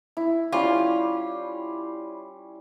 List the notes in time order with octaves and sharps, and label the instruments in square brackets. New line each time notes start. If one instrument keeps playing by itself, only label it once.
[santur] E4
[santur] G3 C#4 [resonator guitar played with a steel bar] F4